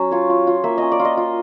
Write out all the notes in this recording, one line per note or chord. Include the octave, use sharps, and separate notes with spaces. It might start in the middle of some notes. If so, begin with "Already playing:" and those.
Already playing: F#3 C#4
F4 C#5
F4
F4
A#3 E5
C#4 D#5
D5
F4
D#5
F4